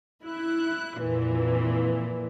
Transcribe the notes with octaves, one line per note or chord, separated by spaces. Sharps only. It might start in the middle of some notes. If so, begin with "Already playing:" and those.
E4 F#6
F2 A#2 E3